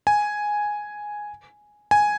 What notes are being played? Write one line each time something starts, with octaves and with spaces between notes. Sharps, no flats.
G#5
G#5